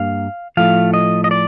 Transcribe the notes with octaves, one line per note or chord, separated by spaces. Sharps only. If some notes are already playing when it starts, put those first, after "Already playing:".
Already playing: G2 A#3 F5
A2 F3 A3 F5
D#5
D#5
D5